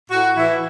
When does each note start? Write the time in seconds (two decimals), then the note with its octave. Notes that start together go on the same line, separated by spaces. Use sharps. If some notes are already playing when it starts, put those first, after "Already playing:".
0.10 A2 F#4
0.36 E3 E4